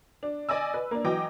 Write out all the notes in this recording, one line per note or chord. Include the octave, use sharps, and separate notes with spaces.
D4
D5 D#5 G#5 E6
B4
A#3 D4
E3 F#3 D#5 G5 D6